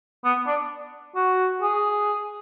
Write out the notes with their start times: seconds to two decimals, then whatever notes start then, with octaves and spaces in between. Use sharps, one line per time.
0.25 B3
0.47 D4
1.15 F#4
1.62 G#4